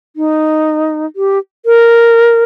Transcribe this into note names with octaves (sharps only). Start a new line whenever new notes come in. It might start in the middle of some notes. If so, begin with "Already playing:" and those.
D#4
G4
A#4